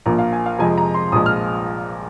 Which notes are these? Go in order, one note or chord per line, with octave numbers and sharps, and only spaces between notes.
A#1 A#2 F3 A#3 A#5
F5
G#5
F5
F2 C3 F3 G#3 G#5
A#5
C6
A#1 A#2 F3 G#3 D#6
F6